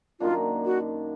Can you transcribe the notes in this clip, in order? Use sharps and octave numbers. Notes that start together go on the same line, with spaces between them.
F#2 D#3 A#3 D4 F4
F#4